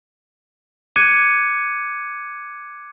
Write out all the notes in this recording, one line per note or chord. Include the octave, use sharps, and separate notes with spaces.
D6 F#6 G#6 C#7 D#7